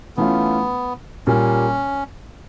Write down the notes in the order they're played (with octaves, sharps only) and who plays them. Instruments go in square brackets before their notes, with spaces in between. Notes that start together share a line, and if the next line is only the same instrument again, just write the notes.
[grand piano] E3 A3 C#4 F4 [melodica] B3
[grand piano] A#2 G3 A#3 [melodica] C#4